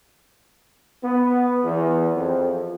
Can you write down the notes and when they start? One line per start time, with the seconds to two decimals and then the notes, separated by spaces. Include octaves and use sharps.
1.03 B3
1.63 E2
2.15 F2